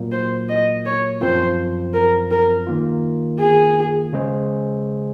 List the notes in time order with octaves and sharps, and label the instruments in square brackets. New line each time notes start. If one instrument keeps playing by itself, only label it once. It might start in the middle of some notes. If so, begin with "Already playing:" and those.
Already playing: [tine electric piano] A#2 F#3 A#3
[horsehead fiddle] C5
D#5
C#5
[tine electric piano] F#2 F3 C4 F4 [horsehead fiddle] C5
[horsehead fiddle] A#4
A#4
[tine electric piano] D#3 A#3 F4
[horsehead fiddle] G#4
[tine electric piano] C#3 G#3 C#4 G#4 C5